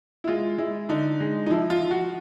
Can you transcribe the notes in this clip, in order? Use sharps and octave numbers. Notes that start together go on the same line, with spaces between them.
E4
G#3 F4
G#3 E4
D3 D#4
G#3
D#4
F3 E4
F4
F3
F#4